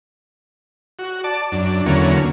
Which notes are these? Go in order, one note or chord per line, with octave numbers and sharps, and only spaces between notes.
F#4
D5 A5 D6
F#2 D4
E2 D3 F#3 A#3 C#4